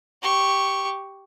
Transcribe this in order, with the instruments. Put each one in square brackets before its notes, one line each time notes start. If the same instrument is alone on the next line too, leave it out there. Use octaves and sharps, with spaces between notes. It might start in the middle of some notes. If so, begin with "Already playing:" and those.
[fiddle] G4 C#6